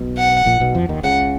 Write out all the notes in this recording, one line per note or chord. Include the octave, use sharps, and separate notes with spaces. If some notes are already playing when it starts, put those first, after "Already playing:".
Already playing: B1 B2
F#5
A#1 A#2
B1 B2
F2 F3
D#2 D#3
C#2 C#3 F#5